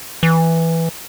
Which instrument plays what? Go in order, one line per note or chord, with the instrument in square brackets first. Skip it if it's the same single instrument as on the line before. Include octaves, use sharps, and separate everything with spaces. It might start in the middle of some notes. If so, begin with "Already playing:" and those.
[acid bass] E3